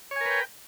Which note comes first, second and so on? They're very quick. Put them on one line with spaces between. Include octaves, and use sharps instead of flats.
C#5 G#5 A#4 B4 G5